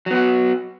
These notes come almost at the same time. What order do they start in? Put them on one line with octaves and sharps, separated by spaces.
F#3 B3 F#4